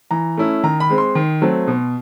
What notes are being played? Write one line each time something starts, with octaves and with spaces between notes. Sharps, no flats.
E3 A#5
A3 C#4 E4
D#3 A#5
B5
G#3 C4
C6
D#3
F#3 A3 C4
B2